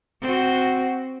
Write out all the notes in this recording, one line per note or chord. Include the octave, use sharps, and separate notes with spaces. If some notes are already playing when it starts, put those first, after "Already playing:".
C4 F#4